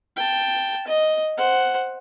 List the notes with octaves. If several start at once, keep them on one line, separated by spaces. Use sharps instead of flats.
G5 A5
D#5
C5 F#5